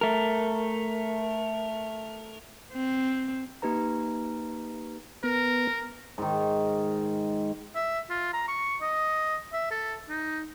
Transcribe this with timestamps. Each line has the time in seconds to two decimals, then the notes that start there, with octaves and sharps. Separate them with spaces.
0.01 A3 A#4
2.73 C4
3.62 A#3 D#4 G4 B4 A#5
5.24 B3 A#4
6.18 G#2 D#3
7.75 E5
8.10 F4
8.33 A#5
8.48 C#6
8.81 D#5
9.53 E5
9.71 A4
10.09 D#4